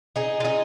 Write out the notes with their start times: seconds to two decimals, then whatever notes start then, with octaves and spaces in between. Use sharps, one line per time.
0.16 D#4 G#4
0.40 F4
0.45 D#4 G#4